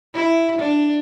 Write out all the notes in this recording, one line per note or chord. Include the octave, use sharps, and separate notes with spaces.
E4
D4